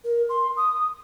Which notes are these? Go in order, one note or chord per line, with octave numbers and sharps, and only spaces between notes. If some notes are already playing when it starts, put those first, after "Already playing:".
A#4
C6
D#6